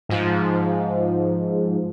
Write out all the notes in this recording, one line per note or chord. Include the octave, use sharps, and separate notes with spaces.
G#2 F3